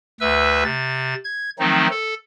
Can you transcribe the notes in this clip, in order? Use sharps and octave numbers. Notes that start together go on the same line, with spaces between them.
D2 B4 E5 E6
C3 A6
G#6
D#3 F3 F#3 A3 C4 D#4
A4